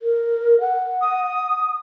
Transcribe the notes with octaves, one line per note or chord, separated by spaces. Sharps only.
A#4
F#5
D#6